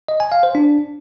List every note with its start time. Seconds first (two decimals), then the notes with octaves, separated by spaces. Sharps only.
0.08 D#5
0.20 G#5
0.32 F5
0.43 C5
0.55 D4